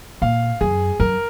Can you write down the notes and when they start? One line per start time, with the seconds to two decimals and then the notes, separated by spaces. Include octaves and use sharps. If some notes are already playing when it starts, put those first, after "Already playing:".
0.22 A#2 F5
0.61 F#2 G#4
1.00 F#2 A#4